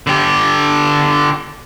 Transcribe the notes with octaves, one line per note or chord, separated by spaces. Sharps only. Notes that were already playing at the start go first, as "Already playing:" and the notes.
D3 G4